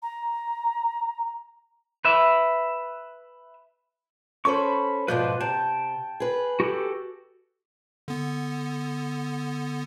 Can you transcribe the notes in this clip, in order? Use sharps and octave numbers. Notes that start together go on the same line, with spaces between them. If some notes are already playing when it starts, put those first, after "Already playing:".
A#5
B4 E5
C#4 A4 C5 B5 C#6
G#2 B2 F3 B4 C5 D5
C3 G5 A5
G#4 B4
F#4 G4 A4
D3 B3